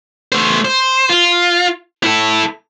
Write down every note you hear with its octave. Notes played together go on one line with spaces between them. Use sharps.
A3 C5
C5
F4
E4 A4